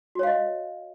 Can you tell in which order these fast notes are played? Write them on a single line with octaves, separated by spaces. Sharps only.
F#4 C#5 F5 D#5